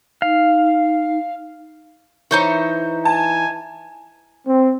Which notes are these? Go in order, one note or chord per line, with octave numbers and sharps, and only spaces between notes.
D#4 F5
E3 D#4 C5 C#5
G#5 A5
C4